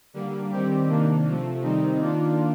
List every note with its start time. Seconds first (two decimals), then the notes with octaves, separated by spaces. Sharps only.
0.14 D3 G3 A#3
0.51 D#3 G3 C4 G4
0.88 C3 D#3 A#3 D4
1.25 C3 F3 A3
1.61 C3 D#3 G3 C4 D#4
1.99 D#3 A#3 D4 F4